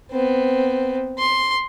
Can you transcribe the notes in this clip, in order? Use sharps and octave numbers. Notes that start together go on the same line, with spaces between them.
B3 C4
C6